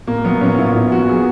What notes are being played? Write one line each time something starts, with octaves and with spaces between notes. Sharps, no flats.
A#2 A#3
F#3 B3
A#1 C#4
A#1 F4
A#2 F4
F#3 F#4
G#4